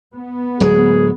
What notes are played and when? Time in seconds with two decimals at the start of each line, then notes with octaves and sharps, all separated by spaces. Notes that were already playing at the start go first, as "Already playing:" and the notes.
0.16 B3
0.60 D1 F#3 G#3 G#4